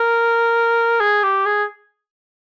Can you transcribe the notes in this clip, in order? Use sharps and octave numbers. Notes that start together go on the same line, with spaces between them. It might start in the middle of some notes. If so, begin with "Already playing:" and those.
Already playing: A#4
G#4
G4
G#4